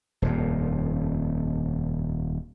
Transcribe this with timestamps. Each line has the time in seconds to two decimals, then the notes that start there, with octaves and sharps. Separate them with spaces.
0.22 D#1 F2 A#2